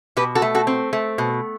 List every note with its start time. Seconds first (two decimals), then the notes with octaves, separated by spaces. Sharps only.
0.17 B2 G4 B4
0.35 F#4 A4
0.42 A3
0.55 F#4 A4
0.67 C4
0.93 A3
1.18 B2